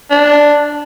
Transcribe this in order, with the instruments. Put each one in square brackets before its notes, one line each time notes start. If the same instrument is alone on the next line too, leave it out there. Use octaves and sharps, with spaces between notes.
[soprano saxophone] D4